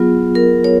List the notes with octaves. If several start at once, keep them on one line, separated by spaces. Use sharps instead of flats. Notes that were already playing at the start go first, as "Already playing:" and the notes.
Already playing: F#3 B3 F4 G#4
A#4
C#5